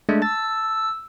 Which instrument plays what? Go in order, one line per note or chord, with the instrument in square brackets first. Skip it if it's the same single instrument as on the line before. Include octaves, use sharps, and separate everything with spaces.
[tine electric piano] G#3 A3 D4
[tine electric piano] A5 A6 [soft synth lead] E6